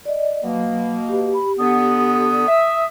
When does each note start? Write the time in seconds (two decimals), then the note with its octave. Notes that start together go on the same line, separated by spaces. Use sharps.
0.05 D5 D#5
0.43 B2 F#3 A#3
1.09 G4
1.34 B5
1.59 D3 B3 D#6
2.47 E5